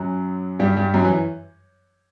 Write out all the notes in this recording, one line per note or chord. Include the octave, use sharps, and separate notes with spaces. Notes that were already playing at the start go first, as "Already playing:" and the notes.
Already playing: F#2 F#3
G2 G3
G2 G3
F#2 F#3
E3